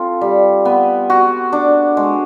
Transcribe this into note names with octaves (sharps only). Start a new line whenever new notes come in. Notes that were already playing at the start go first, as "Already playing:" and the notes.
Already playing: C4 F4 A4
G3
B3
F#4
D4
G#3